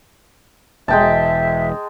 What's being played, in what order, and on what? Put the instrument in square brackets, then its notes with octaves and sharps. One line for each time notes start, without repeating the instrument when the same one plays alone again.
[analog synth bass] E1 [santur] G#3 G5 A5 [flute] E5